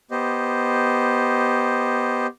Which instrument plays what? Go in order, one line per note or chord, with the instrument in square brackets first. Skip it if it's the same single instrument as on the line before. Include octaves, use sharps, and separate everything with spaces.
[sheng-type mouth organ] B3 G4 C5 D#5